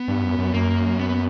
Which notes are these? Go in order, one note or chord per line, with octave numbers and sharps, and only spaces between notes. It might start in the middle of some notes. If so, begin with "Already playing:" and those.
Already playing: B3
G2
F#2
F#2
F#2 A#3
B3